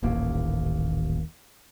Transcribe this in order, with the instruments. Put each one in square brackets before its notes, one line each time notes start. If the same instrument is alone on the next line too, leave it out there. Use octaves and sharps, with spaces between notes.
[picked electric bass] D#1 A1 D#2 A#3